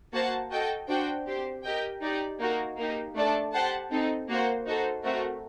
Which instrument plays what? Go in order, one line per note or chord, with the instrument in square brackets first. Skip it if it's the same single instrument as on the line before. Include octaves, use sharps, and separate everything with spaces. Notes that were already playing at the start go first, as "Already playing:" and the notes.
[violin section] A#3 F#4 C5 F#5 A5
F#4 A4 D#5 G5
D4 F#4 C5 G5
C4 G4 C5
G4 A#4 D#5 G5
D#4 G4 D5
A#3 D#4 F#4 A#4
A#3 D#4 G4
A3 D4 A4 D5 A5
G4 C5 F#5 A5
C4 D#4 A4
A#3 F#4 C5
D#4 F#4 A4 C5
A3 C4 F#4 A#4